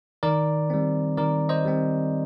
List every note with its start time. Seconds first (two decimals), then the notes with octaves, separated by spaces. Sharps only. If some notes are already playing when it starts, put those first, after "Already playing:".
0.23 D#3 A#4 D5
0.70 G3 C4
1.17 D#3 A#4 D5
1.49 C5 D#5
1.65 G3 C4